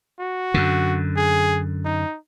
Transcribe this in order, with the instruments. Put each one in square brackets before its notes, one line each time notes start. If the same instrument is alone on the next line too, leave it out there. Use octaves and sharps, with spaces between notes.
[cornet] F#4
[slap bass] F#2 D3
[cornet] G#4
D#4